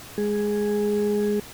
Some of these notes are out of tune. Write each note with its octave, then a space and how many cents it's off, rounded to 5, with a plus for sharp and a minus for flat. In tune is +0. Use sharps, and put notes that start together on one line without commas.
G#3 +0 G#4 +0